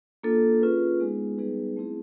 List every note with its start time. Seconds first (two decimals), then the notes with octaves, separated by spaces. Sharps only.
0.23 A#3 D4 F4 A4
0.61 C#4 F4 G#4 B4
1.00 G#3 B3 D#4 G#4
1.38 G3 B3 D#4 G#4 B4
1.77 A3 C4 E4 G#4